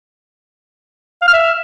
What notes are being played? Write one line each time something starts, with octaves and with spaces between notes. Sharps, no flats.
F5
F6
E5